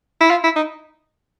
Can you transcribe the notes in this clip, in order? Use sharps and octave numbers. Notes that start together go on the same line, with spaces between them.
E4
F4
E4
D#4